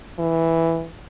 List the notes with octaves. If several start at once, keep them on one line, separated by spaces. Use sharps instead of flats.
E3